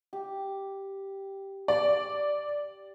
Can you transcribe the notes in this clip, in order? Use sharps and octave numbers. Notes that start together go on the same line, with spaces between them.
G4
D5